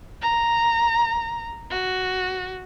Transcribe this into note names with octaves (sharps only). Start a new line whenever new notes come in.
A#5
F#4